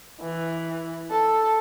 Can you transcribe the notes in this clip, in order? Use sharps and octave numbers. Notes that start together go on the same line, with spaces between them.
E3
A4